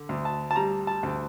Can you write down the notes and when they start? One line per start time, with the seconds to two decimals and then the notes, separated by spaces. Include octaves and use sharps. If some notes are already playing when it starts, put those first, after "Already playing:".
Already playing: D3
0.09 D2
0.25 A5
0.51 A5
0.56 G3 A#5
0.87 A5
1.03 D2